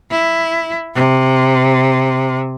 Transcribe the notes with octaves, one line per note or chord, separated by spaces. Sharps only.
E4
C3